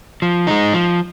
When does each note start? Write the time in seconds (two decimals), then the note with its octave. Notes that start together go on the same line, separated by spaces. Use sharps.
0.22 F3
0.47 G#3 D#4
0.74 F3